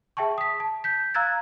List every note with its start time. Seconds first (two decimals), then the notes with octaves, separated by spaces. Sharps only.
0.17 G#4 E5 G5 A5 C#6
0.38 D#6 B6
0.60 A5
0.84 G6 B6
1.14 F5 A#5 E6 F#6 G#6 A6